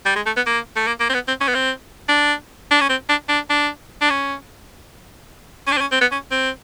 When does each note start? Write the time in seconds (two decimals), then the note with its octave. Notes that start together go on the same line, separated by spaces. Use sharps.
0.06 G3
0.16 G#3
0.26 A3
0.36 B3
0.46 A#3
0.76 A3
0.87 A#3
1.00 A#3
1.10 C4
1.14 B3
1.28 C4
1.41 C#4
1.48 B3
1.55 C4
2.09 D4
2.71 D4
2.81 C#4
2.89 C4
3.09 D4
3.29 D4
3.50 D4
4.01 D4
4.10 C#4
5.67 C#4
5.72 D4
5.77 C4
5.81 C#4
5.92 C4
6.01 B3
6.12 C#4
6.31 C4